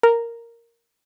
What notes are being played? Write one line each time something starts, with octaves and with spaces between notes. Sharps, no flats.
A#4